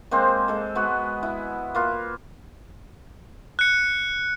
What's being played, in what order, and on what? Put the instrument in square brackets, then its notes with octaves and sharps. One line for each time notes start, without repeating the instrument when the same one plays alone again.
[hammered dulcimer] G#3 A#3 C4 C5
G#3 A4
G#3 B3 F#4
E4
A#3 F4 B4
[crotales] F#6 C#7